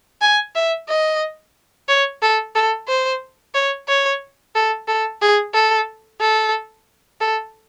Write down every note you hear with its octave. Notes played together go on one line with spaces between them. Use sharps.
G#5
E5
D#5
C#5
A4
A4
C5
C#5
C#5
A4
A4
G#4
A4
A4
A4